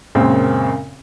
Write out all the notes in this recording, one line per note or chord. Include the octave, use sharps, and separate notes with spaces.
F#2 A#2 C#3 G#3 C4